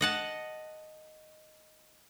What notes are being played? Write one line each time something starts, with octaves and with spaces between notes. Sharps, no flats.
D#5 F#5 A5